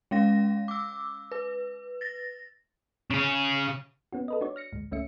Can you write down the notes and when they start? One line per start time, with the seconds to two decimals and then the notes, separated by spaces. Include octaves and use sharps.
0.11 G#3 C#4 F5 A#6
0.68 D6 E6
1.32 B4
2.01 A6 A#6
3.10 C#3 C#4
4.13 B3 C#4 F#4
4.28 A4 B4 D#5
4.41 D4 F#4 C#5 D5
4.56 F6 A#6 C#7
4.73 D2 G#2
4.91 C#2 A3 C#4 E5 C#7